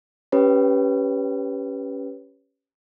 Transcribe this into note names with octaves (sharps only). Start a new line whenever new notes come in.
C#4 G4 B4 C#5